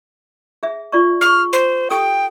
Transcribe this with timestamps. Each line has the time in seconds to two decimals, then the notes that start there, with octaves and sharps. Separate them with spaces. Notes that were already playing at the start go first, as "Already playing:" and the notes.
0.63 G#4 E5
0.92 F4 D5 C#6
1.21 G#4 C#6 F6
1.53 C5
1.90 G4 A4 G5 D#6